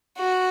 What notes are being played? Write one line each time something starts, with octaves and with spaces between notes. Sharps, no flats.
F#4